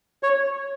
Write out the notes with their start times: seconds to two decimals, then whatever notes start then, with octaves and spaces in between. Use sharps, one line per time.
0.23 C#5